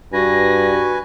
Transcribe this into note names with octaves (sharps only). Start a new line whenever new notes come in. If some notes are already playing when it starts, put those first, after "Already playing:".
G2 F#4 B4 G#5 A#6